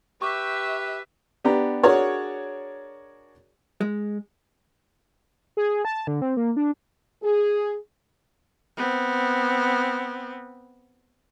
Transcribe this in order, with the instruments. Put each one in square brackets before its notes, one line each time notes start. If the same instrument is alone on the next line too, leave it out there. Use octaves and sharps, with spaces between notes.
[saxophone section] G4 [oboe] B4 [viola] E5 [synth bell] C#6 D6
[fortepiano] B3 D4 G4 A#5
D4 F#4 G#4 A#4 C#5 D5
[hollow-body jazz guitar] G#3
[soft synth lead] G#4
A5
D3
C4
A#3
D4
[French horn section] G#4
[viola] B3 C4